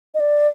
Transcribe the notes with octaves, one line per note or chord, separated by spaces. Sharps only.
D#5
D5